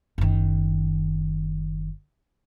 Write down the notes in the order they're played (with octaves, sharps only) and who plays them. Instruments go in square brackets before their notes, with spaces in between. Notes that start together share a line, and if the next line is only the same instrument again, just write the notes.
[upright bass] F#1 D#3